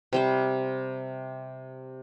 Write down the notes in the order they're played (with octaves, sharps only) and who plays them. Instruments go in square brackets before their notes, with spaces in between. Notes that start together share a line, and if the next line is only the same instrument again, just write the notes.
[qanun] C3 G3 C5